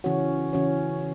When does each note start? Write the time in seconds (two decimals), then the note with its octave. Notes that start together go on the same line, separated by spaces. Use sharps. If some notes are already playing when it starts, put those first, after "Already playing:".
0.04 C#3 E3 C#4 F#4 C#5
0.53 C#3 E3 C#4 F#4 C#5